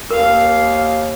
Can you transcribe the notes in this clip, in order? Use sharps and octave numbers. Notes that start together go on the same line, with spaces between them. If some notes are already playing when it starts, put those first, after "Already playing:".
D#2 A#4 F5